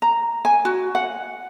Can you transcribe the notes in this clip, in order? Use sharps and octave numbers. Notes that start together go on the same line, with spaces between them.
A#5
G#5
F#4
F#5